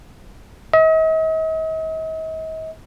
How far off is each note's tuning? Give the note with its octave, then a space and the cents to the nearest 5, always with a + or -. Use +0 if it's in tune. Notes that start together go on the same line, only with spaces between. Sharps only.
D#5 +45